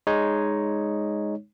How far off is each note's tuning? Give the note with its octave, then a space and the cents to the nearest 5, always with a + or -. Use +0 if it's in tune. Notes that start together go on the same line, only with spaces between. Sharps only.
G#3 +0 D#4 +0 C#5 +0